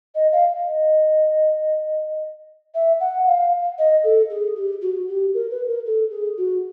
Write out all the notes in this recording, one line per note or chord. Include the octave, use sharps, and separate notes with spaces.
D#5
F5
D#5
E5
F#5
F5
D#5
A4
G#4
G4
F#4
G4
A#4
B4
A#4
A4
G#4
F#4